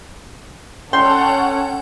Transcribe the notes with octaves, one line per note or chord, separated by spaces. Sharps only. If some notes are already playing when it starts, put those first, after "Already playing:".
C#4 A4 C#5 F#5 G5 C6